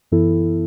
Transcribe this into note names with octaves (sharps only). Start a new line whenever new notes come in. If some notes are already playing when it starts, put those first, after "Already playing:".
F#2 E3 B3 E4 A4